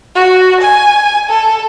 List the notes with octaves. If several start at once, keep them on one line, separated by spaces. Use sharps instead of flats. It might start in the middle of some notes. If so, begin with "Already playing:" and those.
F#4
G#5
A4